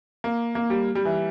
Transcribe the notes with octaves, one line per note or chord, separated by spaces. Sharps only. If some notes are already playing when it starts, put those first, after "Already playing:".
A#3
A#3
G3
G3
E3